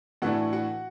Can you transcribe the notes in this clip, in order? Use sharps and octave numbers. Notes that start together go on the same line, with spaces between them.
A2 E3 A3 D4 F#4 F#5
F#4 F#5